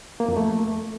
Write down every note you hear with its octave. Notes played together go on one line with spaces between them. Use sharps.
A#3
F2
A3